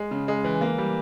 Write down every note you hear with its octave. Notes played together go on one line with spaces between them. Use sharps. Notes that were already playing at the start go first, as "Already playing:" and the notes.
Already playing: G#3
C#3
G#3
E3
A#3
G3